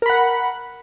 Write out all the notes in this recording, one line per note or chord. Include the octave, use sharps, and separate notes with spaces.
A#4 F#5 B5